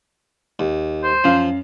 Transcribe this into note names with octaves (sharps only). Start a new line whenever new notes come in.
D#2
C5
F#2 F3 F5